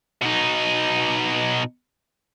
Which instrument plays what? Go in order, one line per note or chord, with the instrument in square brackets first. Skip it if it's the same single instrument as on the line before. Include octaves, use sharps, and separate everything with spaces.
[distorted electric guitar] B2 D#4